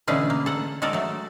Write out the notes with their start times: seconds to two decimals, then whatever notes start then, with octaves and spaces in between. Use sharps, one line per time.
0.08 B2 D3 E3 A3 C#4 G#4
0.30 A#3
0.46 A4 F#5
0.82 G#3 F#4 A4 A#4 D5
0.93 F#3 A3